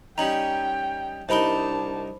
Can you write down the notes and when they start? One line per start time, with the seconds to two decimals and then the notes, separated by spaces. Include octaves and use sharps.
0.18 G3 C#4 D#4 G5 A#5 F#7
1.29 C2 D4 D#4 A#4 C5 A5 B5 G7